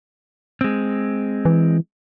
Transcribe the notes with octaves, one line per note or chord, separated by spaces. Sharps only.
G#3 C4
E3